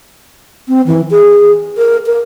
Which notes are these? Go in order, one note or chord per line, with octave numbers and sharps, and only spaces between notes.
C4
E3
G#4
A#4
A#4